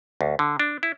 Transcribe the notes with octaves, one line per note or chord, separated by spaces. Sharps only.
D2
D3
D4
E4